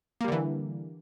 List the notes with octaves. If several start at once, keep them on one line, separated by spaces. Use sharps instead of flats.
D3 E3 G3 A#3